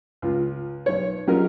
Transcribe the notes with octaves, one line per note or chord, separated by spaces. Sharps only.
C#2 F4
B1 C#5
F#3 C#4 D#4 F4 G#4 A#4